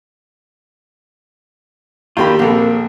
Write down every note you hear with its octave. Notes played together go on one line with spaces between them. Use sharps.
D#2 A#3 D4 F4 G4 B5
A#1 A#3 C4 A4